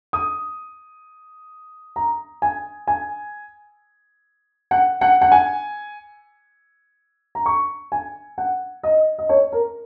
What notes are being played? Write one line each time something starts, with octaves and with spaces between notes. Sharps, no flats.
D#6
A#5
G#5
G#5
F#5
F#5
F#5
G#5
A#5
C#6
G#5
F#5
D#5
D#5
C#5
A#4